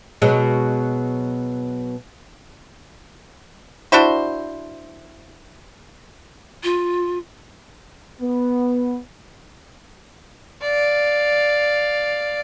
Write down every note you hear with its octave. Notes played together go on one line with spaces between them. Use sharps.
B2 F#3 G#3
D4 E4 F#4 C5
F4
B3
D5 F5